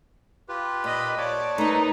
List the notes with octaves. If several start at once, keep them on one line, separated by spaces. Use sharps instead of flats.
F4 G4 B4
A#2 D#5 B5
C#5 D5 A5
A3 D#4 A#4 B4